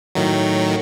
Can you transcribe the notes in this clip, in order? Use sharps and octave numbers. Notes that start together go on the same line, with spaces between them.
A2 D#3 F#3